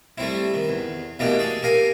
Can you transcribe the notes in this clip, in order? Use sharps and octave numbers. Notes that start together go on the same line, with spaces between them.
G3 A3 C4 E4
D#3
E2
B2 E3 A3 A#3 D4 G4
G#4 A4
G4 A#4 F5 G#5